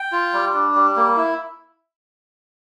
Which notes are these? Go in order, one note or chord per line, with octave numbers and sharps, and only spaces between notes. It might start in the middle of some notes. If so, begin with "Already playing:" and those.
Already playing: G5
F4
G3
D4
G3
A#3
E4